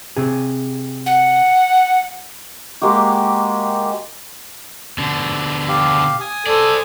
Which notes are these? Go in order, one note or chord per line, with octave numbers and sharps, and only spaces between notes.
C3 G#4
F#5
G#3 A#3 F#4 G4
B2 D3
G4 F5
G#5 D#6
A4 C5 D5